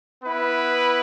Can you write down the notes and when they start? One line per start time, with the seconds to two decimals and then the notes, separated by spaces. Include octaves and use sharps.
0.23 B3 E4 B4